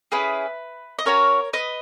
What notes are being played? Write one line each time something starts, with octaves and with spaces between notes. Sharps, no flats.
C#4 E4 G#4 B4
D#5
C#4 F#4 A#4 C#5
B4 D#5